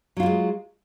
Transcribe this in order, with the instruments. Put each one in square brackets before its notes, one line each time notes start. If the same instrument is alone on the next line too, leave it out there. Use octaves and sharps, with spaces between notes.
[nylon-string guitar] F#3
F4
A#3
G#3